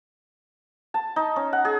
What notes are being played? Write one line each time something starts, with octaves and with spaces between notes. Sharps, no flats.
A5
D#4
C#4
F#5
G#4